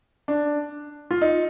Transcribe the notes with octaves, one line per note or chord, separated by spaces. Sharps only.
D4
F4
D#4